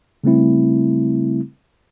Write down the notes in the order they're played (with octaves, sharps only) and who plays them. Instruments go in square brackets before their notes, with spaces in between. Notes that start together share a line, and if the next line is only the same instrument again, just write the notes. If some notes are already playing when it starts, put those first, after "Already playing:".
[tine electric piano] C#3 G3 A3 C4 E4